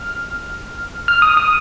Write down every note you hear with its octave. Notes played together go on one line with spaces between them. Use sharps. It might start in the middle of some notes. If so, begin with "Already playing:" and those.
Already playing: F6
F6
D#6
D#6